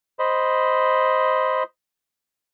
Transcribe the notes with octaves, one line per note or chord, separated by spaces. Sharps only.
C5 D#5 B5